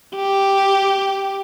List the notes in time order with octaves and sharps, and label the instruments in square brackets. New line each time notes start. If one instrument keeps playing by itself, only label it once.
[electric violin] G4